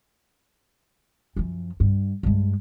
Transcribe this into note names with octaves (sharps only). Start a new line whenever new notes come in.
F#2 F3
G2
G2 G#3